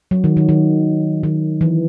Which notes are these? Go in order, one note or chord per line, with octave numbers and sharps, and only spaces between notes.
F#3
D#3
D#3
D#3
D#3
E3